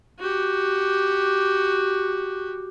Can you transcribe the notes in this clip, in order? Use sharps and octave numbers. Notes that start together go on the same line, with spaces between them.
F#4 G4